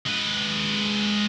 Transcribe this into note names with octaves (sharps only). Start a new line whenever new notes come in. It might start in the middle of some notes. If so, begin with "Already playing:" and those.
G#3 B4